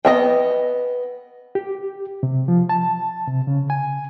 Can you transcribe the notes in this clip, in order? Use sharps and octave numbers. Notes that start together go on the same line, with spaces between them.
B3 D#5 E5 G5
G4
C3
F3
A5
C3
C#3
G#5